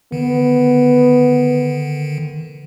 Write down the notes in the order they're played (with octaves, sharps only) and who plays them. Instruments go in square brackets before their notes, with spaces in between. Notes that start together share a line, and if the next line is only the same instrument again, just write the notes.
[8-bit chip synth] D3 D#3 [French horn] B3